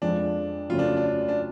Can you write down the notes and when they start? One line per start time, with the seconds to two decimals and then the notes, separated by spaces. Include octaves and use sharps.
0.02 F2 F3 G#3 D4
0.69 F2 C#3 F#3 A3 C#4 F4
0.79 D4
0.97 D4
1.28 D4